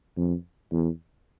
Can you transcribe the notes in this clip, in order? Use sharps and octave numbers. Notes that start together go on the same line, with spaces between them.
F2
E2